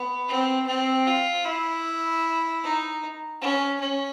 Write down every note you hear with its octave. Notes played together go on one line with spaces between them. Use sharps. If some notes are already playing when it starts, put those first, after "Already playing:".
Already playing: B3
C4
C4
F4
E4
D#4
C#4
C#4